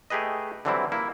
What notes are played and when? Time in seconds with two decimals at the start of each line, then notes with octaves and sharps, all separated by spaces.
0.10 A3 G4 G#4 B4 D#5
0.65 D3 E3 F#3 G3 C4 E4
0.92 A#3 E4